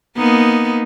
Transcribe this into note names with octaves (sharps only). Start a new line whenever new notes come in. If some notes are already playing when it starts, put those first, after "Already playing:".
A#3 B3 D#4